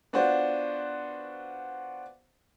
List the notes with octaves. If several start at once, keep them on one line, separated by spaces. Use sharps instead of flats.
B3 D4 F4 F#4 C5